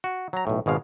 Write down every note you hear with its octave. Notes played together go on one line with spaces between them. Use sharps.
F#4
F#3 A#5
B1 A2
G#1 B2 G#3 F5